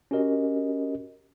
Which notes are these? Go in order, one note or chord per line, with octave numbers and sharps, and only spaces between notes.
C#4 F#4 G4 A#4 D#5